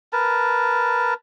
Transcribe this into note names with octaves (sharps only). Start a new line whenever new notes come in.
A#4 B4 A5